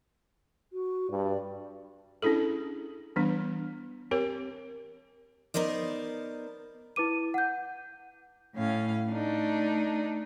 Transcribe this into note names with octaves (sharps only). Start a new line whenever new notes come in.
F#4
G2 D5
C#4 D4 E4 G#4 A4
E3 G3 B3 D4
C4 G4 A#4 C#5
B3 D#4 A#4 C5 D5
E4 B4 D6 D#7
F#5 G6
A2 C#4 F5
A3 D4 D#4